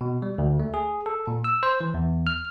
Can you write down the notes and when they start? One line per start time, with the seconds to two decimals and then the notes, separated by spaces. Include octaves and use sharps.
0.01 B2
0.22 G3
0.38 D2
0.60 A3
0.74 G#4
1.06 A4
1.27 A#2
1.44 E6
1.63 C5
1.81 E3
1.94 E2
2.27 F6